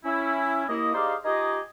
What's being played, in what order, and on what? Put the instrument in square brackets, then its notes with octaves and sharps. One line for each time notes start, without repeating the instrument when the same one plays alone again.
[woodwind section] C#4 E4
D#2 A#3 E4 D#5
D#4 G4 G#4 C5 D5 F5
D#4 F4 G4 G#4 D#5